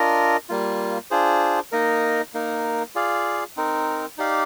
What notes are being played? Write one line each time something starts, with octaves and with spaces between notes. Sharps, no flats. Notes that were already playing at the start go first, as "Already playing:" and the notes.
Already playing: D4 F4 A#4 D#5
G3 A#3 F4
D4 F4 G#4 C5
A#3 D#4 A#4 D#5
A#3 D#4 A#4
F4 G#4 D5 F5
C4 D#4 A#4
D#4 G4 D5 F5